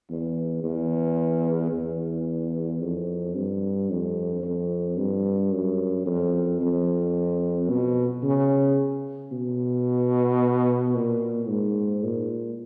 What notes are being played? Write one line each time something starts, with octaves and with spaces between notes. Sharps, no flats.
E2
E2
E2
F2
G2
F2
F2
G2
F#2
F2
F2
B2
C#3
B2
A#2
G#2
A#2